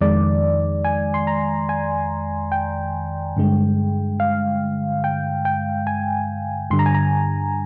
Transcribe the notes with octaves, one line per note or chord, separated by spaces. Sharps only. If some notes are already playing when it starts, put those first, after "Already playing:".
F2 D#3 G#3 D5
G#5
C6
A#5
G#5
G5
G2 D3 G#3
F5
G5
G5
G#5
G2 D3 G3 C6
A#5
G#5
A#5